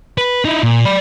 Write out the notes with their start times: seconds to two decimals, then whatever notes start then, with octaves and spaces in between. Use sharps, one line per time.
0.18 B4
0.45 D#4 E4
0.63 A#2
0.85 D5 B5